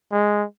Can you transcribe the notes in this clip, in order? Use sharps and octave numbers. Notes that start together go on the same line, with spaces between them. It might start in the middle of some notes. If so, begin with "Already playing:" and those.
G#3